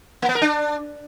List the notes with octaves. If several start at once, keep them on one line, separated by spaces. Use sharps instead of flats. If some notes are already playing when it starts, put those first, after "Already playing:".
A#3
B3
A#4
D4